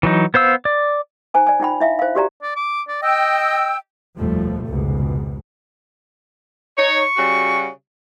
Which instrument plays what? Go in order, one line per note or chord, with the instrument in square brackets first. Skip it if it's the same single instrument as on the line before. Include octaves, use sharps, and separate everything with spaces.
[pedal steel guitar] E3 F#3 D#4
B3 C5 F5 E6
D5
[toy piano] D#4 C5 G#5 A#5
D5 G#5
D#4 F4 G5 B5
E4 E5 F5
C5 F5
F#4 G4 D5 A#5
[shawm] D5
D6
D5
[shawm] D#5 [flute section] G5 E6
[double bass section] F1 D#2 B2 F3 G3 A3
F1 C#2 G#2 B2
[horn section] D#4 C#5 [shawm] C#6
[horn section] C#3 G3 F#4